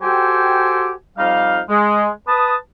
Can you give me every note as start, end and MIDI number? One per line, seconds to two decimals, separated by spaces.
0.03 0.92 66
0.03 0.92 67
0.03 0.92 69
0.03 0.92 72
0.03 0.92 79
0.03 0.92 80
1.18 1.59 41
1.18 1.59 55
1.18 1.59 63
1.18 1.59 77
1.69 2.08 56
2.28 2.55 71
2.28 2.55 81
2.28 2.55 87